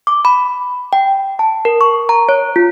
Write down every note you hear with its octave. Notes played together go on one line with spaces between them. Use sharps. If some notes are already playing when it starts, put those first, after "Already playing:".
D6
B5
G5
A5
A#4
C#6
A#5
C#5
F4